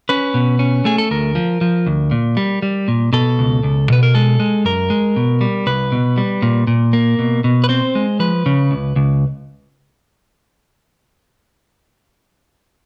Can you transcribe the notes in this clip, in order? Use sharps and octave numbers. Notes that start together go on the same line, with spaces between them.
C#4 B4
B2
C#4
A3 G#4
A4
D2 A#4
F3
F3
D2
A#2
G3
G3
A#2
B2 A4
C#2
C#2
B2 B4
A#4
G#3 A4
G#3
F#2 A#4
G#3
B2
G3
C2 B4
B2
G3
A#2
A#2
A#3
B2
B2
B4
C4 C5
G#3
F3 B4
C#3
C#2
C#2